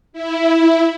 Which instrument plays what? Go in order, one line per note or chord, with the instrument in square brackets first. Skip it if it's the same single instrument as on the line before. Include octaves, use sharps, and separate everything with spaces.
[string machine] E4